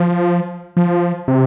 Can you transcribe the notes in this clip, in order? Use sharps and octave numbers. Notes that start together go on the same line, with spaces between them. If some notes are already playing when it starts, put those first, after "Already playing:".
Already playing: F3
F3
C3